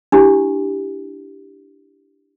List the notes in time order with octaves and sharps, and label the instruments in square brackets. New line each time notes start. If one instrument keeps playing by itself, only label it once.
[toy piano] D4 E4 G4